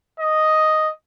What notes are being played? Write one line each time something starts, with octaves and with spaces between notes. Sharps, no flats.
D#5